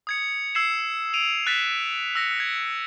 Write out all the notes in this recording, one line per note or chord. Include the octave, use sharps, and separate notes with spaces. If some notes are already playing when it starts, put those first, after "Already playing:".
D#6 G#6 C#7
E6 G#6 C7 E7
D7 D#7 F7
F#6 A6 B6 E7
E6 A#6 C#7
G#6